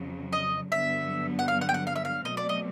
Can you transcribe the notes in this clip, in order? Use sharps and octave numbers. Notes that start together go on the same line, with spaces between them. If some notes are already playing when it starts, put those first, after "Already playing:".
Already playing: F2 C#3 F#3
D#5
G2 D3 F#3 B3 E5
F#5
F5
F#5
G5
F#5
F5
E5
F5
B2 F#3 A3 C4 D#5
D5
D#5